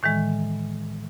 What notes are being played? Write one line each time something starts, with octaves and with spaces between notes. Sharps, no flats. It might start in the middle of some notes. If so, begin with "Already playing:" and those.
A2 D#3 E3 G#3